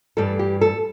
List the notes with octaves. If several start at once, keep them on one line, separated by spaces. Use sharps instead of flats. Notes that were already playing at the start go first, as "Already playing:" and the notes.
G2 E3 G3 A4
G4
A4